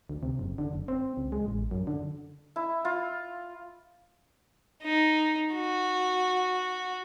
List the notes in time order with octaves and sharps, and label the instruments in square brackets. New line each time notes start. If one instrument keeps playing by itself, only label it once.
[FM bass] D2
C3
F#1
D3
F#1
C4
C#2
G#3
A1
F#2
D3
[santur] E4
F4
[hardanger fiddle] D#4
F#4